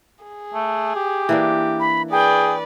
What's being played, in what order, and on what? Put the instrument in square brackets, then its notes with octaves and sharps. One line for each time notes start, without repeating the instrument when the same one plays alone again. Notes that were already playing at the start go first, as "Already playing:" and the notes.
[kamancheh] G#4
[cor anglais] A3
G4
[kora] E3 A#3 D4
[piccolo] B5
[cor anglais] G#4 [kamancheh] B4 D5 [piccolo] G5